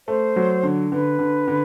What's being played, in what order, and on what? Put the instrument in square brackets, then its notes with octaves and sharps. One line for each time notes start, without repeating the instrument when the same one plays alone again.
[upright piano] A3 [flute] C5
[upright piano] F#3
D3
[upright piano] D3 [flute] B4
[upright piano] D3
D3